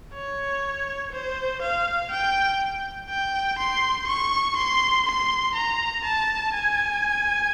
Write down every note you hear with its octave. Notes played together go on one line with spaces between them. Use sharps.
C#5
C5
F5
G5
G5
C6
C#6
C6
C6
A#5
A5
G#5